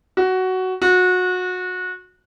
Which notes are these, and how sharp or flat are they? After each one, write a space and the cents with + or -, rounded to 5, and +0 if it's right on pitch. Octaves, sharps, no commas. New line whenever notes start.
F#4 +10
F#4 -25